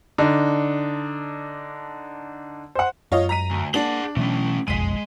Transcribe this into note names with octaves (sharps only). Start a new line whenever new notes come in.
D3 D4 D#4
C5 F#5
F#2 F4 C#5 D#5
A#5 B6 D#7
D2
A#3 D4 G#4 F#5 F#7
B2 E3 F#3 A3 C#4
F#1 B1 F2 G#3 B6 D#7